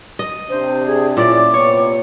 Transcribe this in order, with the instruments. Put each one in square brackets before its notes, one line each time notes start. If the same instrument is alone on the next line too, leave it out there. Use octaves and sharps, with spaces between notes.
[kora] D#5
[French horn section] C3 D4 [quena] C5
[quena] G#4
[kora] A#2 D5 [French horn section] C#4 E4 [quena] D6
[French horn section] C3 B3 [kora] C#5